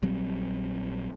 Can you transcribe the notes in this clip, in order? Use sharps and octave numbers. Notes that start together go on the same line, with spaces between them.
A#1 F#3 G3 C4